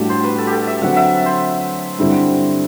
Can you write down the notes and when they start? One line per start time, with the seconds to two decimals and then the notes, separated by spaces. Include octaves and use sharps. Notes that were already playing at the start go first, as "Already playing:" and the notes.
Already playing: A2 G3 D4 F#4 G4 A4
0.09 C5
0.24 B4
0.38 A4
0.47 G4
0.52 A4
0.67 E5
0.81 D3 F#3 C4 F#4 F#5
0.96 E5
1.26 C5
1.99 G2 D3 G3 C4 E4